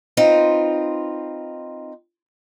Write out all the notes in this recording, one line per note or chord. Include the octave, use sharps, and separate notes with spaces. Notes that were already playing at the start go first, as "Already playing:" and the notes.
C4 D#4 F4 B4